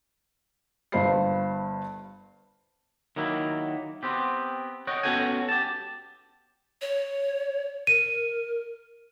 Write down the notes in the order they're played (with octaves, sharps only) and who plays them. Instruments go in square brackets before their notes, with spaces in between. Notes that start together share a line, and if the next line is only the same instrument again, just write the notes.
[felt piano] G1 G2 C5 F5 B5 C7
[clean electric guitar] D#3 F#3 A#3 E4
B3 C4 G4
C#5 D#5 F#5 G5
B3 C#4 F#4 A4 G5 G#5
G4 A5
[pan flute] C#5
[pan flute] A#4 [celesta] D#7